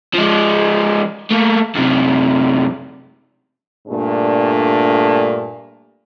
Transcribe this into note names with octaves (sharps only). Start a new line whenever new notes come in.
F3 G#3
A3 A#3
F#2 C3
G2 A#2 A3 D4